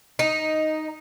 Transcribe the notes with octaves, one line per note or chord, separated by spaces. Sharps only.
D#4